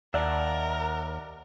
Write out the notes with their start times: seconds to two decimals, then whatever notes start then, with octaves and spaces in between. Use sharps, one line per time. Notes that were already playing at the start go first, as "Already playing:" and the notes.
0.14 D#2 A#4 D5 E5 F#5 A5